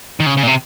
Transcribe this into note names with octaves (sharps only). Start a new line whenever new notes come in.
D#3
C#3
C#3
A#2
C3